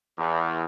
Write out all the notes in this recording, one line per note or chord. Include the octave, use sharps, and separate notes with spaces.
E2